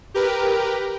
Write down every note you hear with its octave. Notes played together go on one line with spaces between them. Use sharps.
G4 A#4 B4